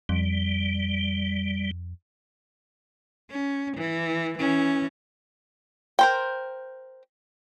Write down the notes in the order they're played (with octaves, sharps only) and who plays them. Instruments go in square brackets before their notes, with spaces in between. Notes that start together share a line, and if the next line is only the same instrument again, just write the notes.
[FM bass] F2 [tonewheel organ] G3
[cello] C#4
E3
E3 C#4
[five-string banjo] A#4 C5 G5